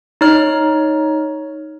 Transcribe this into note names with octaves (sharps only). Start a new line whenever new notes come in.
D#4 C#5 F6